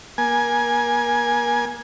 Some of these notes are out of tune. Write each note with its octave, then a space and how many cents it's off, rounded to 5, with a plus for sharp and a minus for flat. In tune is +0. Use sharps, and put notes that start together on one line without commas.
A#3 +35 G#5 +0